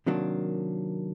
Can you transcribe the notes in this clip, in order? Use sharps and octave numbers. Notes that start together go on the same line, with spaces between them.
C3 D#3 F#3 A#3 D4